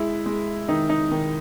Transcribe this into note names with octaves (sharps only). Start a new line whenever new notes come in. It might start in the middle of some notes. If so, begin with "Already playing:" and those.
Already playing: G#3 E4
G#3
D#3 D#4
D#4
D#3